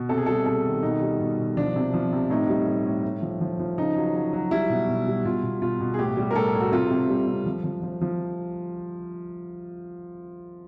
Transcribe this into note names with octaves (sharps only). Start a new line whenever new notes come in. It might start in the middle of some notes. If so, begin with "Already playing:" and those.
Already playing: B2
C3 A4
G#4
G3 A4
C3 A4
D#3
B2 D#4
G3
B2
B2
F3 D4
C3
F3
C3
A2 D#4
G3
A2
A2
A2
F3
F3
F3
C#3 D#4
F#3
F#3
F#3
G3 E4
B2
B2
G3
B2 F4
B2
B2 F4
B2
G#4
A2 G4
G3
A#4
A2 A4
A2
F#4
C3 F4
C3
G3
C3
F3
F3
F3
F3